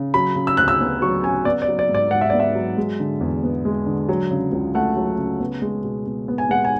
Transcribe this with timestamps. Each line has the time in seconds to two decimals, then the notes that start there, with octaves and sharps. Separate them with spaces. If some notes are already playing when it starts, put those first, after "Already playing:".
Already playing: C#3
0.14 F#3 B5
0.35 C#3
0.47 E6
0.57 D2 F#6
0.68 E6
0.81 B3
1.02 F#3 C#6
1.24 C#3 G#5
1.45 B3 D5
1.62 D5
1.68 F#3
1.79 D5
1.89 G#2
1.95 D5
2.11 G#2 F#5
2.21 E5
2.30 B3 D5
2.40 E5
2.55 F#3
2.77 G#3
3.00 D3
3.21 E2
3.43 B3
3.65 G#3
3.86 D3
4.09 F#3
4.31 C#3
4.52 C#2
4.75 A3 F#5
4.97 F#3
5.18 C#3
5.40 B3
5.62 G#3
5.84 B2
6.07 B2
6.28 B3
6.38 G#5
6.49 G#3 F#5
6.65 G#5